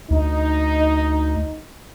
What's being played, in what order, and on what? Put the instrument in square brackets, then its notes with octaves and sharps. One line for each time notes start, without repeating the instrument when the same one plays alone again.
[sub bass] D2 [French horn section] D#4